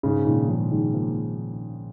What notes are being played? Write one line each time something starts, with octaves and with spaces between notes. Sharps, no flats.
G#2 C#3
A#2 D#3
C#3 F3
D#3 G#3
F3 A#3